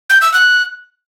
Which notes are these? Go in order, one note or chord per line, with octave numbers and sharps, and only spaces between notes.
G6
E6
F#6